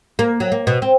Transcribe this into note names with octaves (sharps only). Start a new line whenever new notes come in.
A#3
F#3
A#3
B2
C4